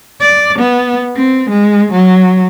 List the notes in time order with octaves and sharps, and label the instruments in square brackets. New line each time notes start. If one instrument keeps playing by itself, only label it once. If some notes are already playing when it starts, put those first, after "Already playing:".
[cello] D5
B3
C4
G#3
F#3